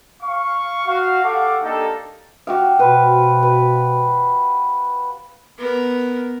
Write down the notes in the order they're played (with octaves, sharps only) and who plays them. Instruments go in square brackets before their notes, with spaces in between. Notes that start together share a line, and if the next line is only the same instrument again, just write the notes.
[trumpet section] F5 C#6
F#4 F5
G4 A4 F5 F#5 C#6 D6
A#3 D4 D#4 G4 A4
[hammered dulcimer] F#4 G4 F5
[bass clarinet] B2 [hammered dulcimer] B4 C5
[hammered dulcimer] B4
[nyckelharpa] B3 A#4